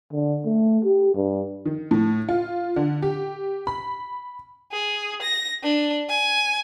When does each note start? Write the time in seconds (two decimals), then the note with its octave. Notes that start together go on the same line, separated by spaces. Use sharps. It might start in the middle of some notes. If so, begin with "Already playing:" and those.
0.13 D3
0.45 A3
0.85 G4
1.15 G2
1.65 D#3
1.91 A2
2.29 F4
2.76 D3
3.02 G4
3.67 B5
4.72 G#4
5.22 A#6
5.63 D4
6.09 G#5